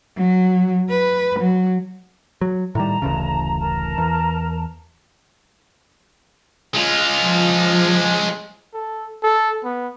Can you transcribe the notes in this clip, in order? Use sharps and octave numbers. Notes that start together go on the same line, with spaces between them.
F#3
B4
F#3
F#3
A2 D#3 G3 A5 A#5
D1 A1 C#3
A#4 A5 A#5
E2
G#3 F4
F3
A4
A4
B3